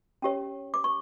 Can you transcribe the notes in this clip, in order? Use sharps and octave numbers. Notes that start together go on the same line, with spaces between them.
C#4 G4 C#5
D6
C#6